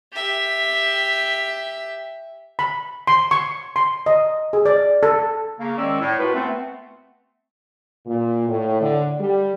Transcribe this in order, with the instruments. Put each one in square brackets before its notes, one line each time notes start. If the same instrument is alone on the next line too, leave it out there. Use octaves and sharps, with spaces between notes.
[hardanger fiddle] G4 E5
[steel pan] B5
C6
C#6
C6
D#5
G#4
D5
A4
[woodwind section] C#3 A#3
D#3 G#3 C#4 D5 E6
A2
A3 F4 F#4 A#4 B4
A3 B3 C4
[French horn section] A#2
A2
D3
G3